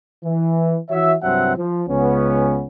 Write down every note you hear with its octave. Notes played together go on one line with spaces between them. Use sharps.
E3
E3 F#4 C#5 E5
C2 G2 F#3 C4 E5 F#5
F3
C#2 B3 C#4